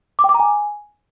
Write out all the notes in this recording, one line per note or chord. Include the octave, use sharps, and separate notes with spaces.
D6
G5
D6
A#5
G#5